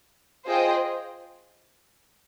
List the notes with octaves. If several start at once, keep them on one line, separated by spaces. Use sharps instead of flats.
F4 G#4 C5 D#5 G5